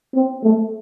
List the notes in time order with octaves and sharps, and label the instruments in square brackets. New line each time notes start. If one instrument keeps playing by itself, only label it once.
[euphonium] C4
A3